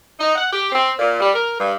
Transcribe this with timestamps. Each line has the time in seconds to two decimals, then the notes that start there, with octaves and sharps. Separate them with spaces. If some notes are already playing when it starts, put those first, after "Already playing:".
0.20 D#4
0.35 F#5
0.52 G4
0.72 C4
0.99 A#2
1.20 G3
1.33 A#4
1.59 G2